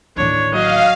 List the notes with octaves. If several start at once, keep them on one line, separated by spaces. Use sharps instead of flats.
A1 D#2 D4 C#5
F#3 D#5 F5